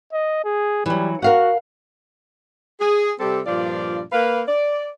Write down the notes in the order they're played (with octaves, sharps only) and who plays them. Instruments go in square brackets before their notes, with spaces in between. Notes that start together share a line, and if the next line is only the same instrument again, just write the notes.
[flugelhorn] D#5
G#4
[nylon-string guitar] E3 F#3 [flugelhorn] G3
[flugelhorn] F#4 [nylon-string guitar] A#4 F5 F#5
[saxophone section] G#4
C3 G3 C4 G4 A4
G2 A#2 F3 D4 F4 D5
A#3 B4 F5
D5